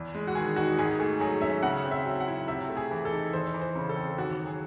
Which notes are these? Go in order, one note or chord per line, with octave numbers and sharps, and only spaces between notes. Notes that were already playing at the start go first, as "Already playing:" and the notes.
Already playing: E2
G#3
F#4
D#3 G#4
D#4 F#4
G#2 G#4
A3 G#4
F#3 G#4
C#4 E5
C#3 F#5
C4
E5
F#3
F#5
E4
C3 E5
A3
G#4
E3
A4
D#4
E2 C5
E3
C5
C#3
A4
C4
D#2 F#4
F#3
G#4